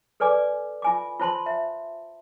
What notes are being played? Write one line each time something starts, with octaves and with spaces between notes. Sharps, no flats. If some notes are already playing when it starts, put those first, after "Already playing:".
A4 B4 D5 G#5 D6
F4 G#5 D6
F4 C5 A5 C6
E5